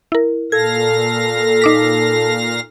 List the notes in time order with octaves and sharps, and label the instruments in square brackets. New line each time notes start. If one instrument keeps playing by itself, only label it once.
[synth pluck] E4 A#4
[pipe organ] A#2 F5 A#6 [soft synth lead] A4 [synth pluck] G#6
[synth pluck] D#4 D6 B6